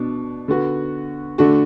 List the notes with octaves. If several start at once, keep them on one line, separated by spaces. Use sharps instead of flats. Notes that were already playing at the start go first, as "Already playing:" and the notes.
Already playing: B2 D4
D3 B3 F#4
D3 A3 D4 F#4